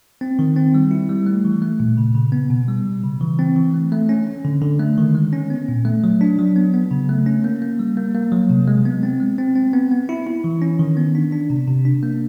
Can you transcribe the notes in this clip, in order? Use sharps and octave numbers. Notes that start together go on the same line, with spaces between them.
C4
D#3
C4
G3
E4
G3
A3
E3
A3
A#2
C#3
C#3
B3
B2
G3
G3
C#3
E3
C4
E3
A3
A3
C#4
C#4
D3
D3
A3
D#3
G#3
C#4
B3
A#2
A3
F#3
D4
F#3
B3
B3
C#3
A3
C#4
A#3
A#3
G3
A#3
A#3
F#3
C3
G#3
B3
C4
G#3
C4
C4
B3
B3
E4
E4
E3
C#4
D#3
B3
D4
D4
C3
C3
D4
A#3